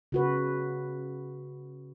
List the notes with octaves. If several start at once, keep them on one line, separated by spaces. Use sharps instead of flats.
C#3 F#4 B4